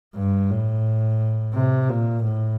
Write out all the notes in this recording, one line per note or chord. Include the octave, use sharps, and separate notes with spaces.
G2
A2
C3
A#2
A2